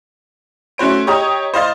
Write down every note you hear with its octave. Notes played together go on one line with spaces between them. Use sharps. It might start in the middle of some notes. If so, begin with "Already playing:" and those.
A3 C#4 F#4 C5 D7
G4 C#5 D#5 G5 A#5 D#6
C5 D#5 F5 C6 A6